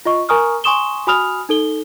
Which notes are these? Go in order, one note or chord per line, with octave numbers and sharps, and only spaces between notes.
F4 D#5 C#6
A#4 G#5 A#5 C#6 D#6 F6
G#5 C6 C#6 D#6 E7 G7
F#4 G#5 B5 D#6 F6 F7
D#4 A4 G7